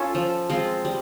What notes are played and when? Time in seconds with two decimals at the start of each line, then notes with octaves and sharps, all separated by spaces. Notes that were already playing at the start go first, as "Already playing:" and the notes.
Already playing: C#4 F4 A4
0.15 F3
0.49 G#3 C4 F4
0.85 G3